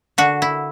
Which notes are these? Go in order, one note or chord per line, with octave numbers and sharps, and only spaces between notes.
D3 F#4
E4